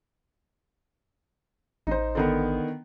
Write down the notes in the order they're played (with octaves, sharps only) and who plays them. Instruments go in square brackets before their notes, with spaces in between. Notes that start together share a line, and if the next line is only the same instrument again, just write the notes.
[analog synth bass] A1 [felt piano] D#4 C5
[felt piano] D3 D#3 B3